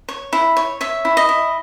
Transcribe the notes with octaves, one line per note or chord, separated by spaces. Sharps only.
C#5
E4
C#5
C#5 E5
E4
D#5
E4